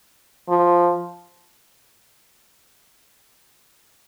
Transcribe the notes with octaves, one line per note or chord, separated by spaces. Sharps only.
F3